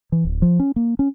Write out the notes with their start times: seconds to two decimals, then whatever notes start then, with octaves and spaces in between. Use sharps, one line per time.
0.12 E3
0.25 D1
0.42 F3
0.60 C#4
0.76 A#3
0.99 C#4